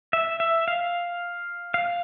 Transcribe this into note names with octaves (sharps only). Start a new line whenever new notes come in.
E5
E5
F5
F5